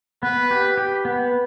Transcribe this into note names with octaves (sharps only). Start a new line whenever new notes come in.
B3 B4
G4
G4
B3